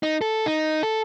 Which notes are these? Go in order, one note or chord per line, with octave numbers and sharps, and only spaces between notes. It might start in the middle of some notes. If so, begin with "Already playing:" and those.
D#4
A4
D#4
A4